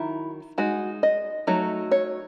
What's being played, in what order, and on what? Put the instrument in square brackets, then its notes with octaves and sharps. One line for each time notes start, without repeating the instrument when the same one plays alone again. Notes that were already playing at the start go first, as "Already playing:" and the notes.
Already playing: [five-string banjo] D#3 F#3 E4
G#3 D#4 F#4
D#5
F#3 A3 D#4
C#5